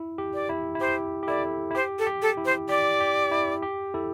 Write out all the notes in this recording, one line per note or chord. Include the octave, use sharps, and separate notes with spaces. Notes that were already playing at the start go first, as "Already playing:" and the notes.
Already playing: E4
G4
D5
E4
E4
G4 C5
G4
E4 A4 D5
E4
G4 C5
A4
G4
A4
E4
C5
G4 D5
G4
E4
G4
E4 A4